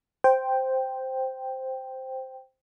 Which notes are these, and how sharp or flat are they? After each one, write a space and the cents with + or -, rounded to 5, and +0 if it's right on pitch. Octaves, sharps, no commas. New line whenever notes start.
C5 +0 G5 +0